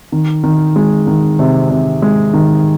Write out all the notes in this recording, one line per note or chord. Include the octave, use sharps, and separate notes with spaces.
D#3
D#3
G#3
D#3
C3
C3
G#3
D#3